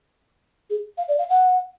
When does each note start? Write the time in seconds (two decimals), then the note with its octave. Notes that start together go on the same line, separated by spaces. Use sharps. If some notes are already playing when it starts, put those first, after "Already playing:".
0.70 G#4
0.98 F5
1.08 D5
1.18 F5
1.29 F#5